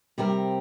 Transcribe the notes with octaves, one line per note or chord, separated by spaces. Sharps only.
C3 G3 C4 G4 A#4